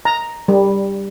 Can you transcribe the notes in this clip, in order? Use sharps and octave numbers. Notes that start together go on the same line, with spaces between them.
A#5
G3